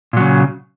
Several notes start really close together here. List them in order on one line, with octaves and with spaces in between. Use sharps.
A#2 F#3 C#3